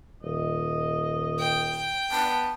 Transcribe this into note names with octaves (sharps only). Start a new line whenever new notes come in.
D#1 D#5
G5
B3 A5